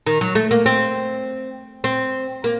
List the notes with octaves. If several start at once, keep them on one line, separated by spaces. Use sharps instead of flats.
D#3
F#3
A3
A#3
C4
C4
A#3